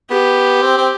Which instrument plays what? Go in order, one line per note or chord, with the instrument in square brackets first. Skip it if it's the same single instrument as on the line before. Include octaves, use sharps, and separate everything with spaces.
[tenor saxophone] B3 [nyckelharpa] G4
[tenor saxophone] C4
C4